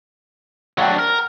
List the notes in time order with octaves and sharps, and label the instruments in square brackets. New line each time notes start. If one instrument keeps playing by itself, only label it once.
[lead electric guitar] F#3 D4 [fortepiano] F#5 G5
[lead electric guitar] A#4